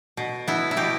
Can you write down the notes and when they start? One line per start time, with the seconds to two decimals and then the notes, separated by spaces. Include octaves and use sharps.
0.17 B2
0.48 B3 E4
0.71 E4
0.77 B2 G4